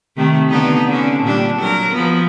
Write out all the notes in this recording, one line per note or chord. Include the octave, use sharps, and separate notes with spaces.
C3 D#3 A3
D3 B3 D#4
D3 C#4
A#2 G3 D4
F#3 A#4
F3 B3